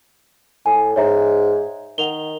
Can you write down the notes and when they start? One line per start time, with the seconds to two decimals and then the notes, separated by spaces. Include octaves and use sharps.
0.66 A2 G#5
0.96 G#2 C#5 E5 A#5
1.98 D#3 F#5 F7 G7